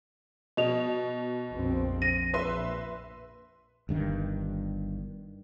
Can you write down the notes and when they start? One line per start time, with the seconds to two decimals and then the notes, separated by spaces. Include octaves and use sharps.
0.57 B2 D#5 F7
1.51 A#1 F2 C4
2.02 A#6 D#7
2.34 A#1 B4 E5 C6
3.89 G1 G2 D#3